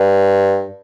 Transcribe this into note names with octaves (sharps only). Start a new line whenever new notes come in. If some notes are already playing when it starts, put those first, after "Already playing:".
Already playing: G2